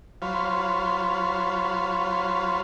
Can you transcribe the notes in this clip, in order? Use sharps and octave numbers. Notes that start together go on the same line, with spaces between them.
F#3 F4 C5 C#5 F5 B5